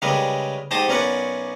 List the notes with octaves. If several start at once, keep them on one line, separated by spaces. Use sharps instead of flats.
C#3 G3 G#3 A#4 B4
G#2 G4 C5 D#5 A5 D#6
B1 C#4 A#4 B4 D5 F#5